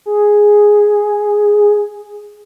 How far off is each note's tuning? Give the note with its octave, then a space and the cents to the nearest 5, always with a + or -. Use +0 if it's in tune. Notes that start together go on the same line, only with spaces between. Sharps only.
G#4 +0